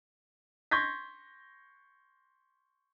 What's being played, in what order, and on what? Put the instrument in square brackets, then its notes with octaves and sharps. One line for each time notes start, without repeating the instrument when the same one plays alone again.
[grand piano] C6 C#6 G6 G#6 A#6 B6